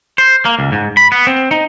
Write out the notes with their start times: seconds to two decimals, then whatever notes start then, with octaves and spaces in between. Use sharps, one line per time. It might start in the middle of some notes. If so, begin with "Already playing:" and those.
0.18 C5
0.45 A#3
0.59 C#2
0.72 G#2
0.97 B5
1.12 B3
1.27 C4
1.51 D#4